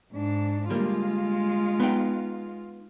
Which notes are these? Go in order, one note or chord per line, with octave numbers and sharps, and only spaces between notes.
G#2 D4
D3 G3 G#3 A#3 F4
B3 D#4 G5